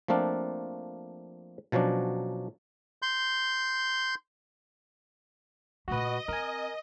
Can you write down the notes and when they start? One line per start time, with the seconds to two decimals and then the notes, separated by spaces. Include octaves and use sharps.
0.08 F3 A3 A#3 C4 D4 F4
1.72 B2 F3 F#3 C#4 D4
3.02 C6 G6
5.88 A#2 A3 F#4 B4 D#5
6.28 C4 A#4 G#5